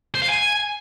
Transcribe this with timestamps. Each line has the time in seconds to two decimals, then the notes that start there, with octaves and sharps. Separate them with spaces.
0.15 C5
0.22 F5
0.29 G#5